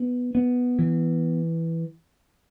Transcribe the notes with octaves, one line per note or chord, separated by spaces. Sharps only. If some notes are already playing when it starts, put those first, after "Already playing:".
Already playing: B3
B3
E3